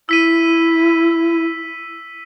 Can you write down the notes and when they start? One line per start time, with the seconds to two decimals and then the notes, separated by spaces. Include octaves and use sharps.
0.09 E4 E6 B6 D#7